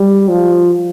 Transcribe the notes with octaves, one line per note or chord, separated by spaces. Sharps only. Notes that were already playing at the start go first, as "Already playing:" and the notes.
Already playing: G3
F3